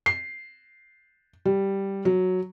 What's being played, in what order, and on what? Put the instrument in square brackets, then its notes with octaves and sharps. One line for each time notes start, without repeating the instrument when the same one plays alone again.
[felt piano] C7
G3
F#3